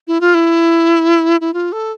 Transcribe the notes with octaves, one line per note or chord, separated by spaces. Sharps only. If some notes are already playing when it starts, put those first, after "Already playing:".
E4
F4
E4
E4
F4
A4